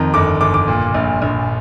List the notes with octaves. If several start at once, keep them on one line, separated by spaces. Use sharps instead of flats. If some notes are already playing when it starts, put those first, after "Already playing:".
Already playing: F2 D#3 A#5
G1 D6
G1 D6
D6
A#2
A#1
A#1